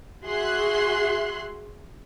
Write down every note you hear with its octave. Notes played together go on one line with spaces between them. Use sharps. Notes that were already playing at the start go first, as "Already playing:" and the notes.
F#4 G#4 E5 C6 F#6